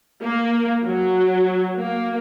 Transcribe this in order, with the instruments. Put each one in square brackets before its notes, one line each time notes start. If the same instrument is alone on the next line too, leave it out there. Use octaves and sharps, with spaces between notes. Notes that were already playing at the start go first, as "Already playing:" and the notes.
[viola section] A#3
F#3
A#3